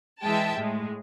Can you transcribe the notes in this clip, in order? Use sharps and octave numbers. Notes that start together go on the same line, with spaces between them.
E3 G#3 E5 G5 A5
A2 G#3